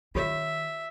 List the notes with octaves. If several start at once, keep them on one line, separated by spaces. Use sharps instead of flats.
D#3 C#4 F4 G4 C#5 E5